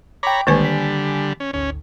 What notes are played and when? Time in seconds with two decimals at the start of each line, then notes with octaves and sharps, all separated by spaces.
0.23 C#5 G5 A#5 B5 D6
0.47 B1 D3 D#3 G3 G#3 A#3 B4 G#5
0.64 G#5 B6
1.40 C#4
1.53 G#1 D2 C#4